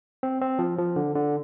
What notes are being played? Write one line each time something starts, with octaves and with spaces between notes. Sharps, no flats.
C4
C4
F3
F3
D3
D3